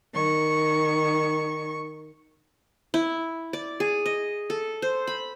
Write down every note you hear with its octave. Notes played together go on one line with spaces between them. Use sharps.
D#3 C#6
E4
D5
G#4
D#5
A4
C5
B5